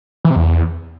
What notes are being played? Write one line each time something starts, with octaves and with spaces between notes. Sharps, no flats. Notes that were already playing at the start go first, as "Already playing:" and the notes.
E3
C3
E2